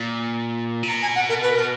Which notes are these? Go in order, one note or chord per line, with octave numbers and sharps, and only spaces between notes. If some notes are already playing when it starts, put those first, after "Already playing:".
Already playing: A#2
C#3
B2 A#5
G#5
F#5
A#4
B4
A#4